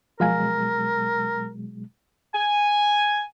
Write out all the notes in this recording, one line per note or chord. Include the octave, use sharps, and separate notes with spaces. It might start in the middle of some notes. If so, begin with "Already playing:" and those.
B2 F3 F#3 G#3 A#4 F5 G#5
G#5